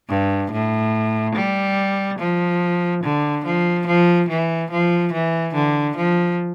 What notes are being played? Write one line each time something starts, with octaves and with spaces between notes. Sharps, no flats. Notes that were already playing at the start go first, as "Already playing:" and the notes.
G2
A2
G3
F3
D3
F3
F3
E3
F3
E3
D3
F3